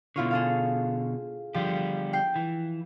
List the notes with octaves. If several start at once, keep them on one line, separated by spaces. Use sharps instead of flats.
B2 D3 E4 F4 C#5
G#4 A4 F5
D3 F3 G3 G4
G5 G6 C7
E3